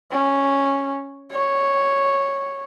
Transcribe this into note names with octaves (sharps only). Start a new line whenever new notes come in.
C#4
C#5